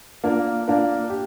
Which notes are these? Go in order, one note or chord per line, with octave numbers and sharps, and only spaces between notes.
A#3 D4 F4 A#4
A#3 D4 F4 A#4
G4